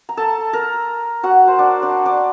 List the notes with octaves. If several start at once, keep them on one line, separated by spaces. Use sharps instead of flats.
A#5
A4 A5
A#4 A#5
F#4 F#5
C5
D4 D5
D4 D5
D4 D5